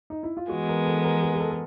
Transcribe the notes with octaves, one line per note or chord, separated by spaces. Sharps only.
D#4
E4
F4
E3 G#3 B3 F#4
A#4
A4
A#4
G#4
G#4
A4
A4